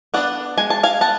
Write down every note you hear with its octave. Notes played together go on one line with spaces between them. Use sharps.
B3 D4 D5 F#5
G#3 G#5
A5
F5 G#5
B3 F#5 A5